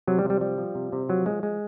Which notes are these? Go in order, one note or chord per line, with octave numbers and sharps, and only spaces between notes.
C3 F#3
G3
C3
G3
F3 G3
F3
C3
C3
F3 F#3
F3 G#3
F3 G#3